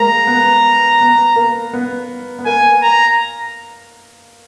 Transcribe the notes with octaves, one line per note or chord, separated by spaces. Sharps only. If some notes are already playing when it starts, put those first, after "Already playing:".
Already playing: G#3 A#3 A#5
B3
B3
A#3
B3
B3
A#3 G#5
A#5